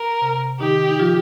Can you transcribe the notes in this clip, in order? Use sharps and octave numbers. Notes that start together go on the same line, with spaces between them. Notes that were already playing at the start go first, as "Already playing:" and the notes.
Already playing: A#4
C3
D#3 D#4 G4
D#4
F3 F4